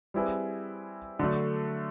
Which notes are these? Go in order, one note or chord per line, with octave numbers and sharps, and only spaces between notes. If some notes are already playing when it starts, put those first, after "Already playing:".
G3 C4 E4 G#4 B4
D3 F#3 A3